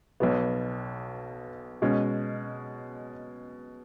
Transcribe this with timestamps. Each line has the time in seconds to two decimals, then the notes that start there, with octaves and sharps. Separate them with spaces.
0.20 B1 B2 B3
1.82 B2 G#3 C#4